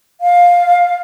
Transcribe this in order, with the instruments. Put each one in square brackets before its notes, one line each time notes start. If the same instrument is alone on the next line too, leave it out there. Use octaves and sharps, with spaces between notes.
[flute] F5